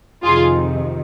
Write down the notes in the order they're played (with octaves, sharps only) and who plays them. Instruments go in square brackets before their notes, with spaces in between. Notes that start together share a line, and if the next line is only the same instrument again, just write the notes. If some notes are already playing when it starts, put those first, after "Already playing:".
[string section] F2 C3 D#3 F4 G#4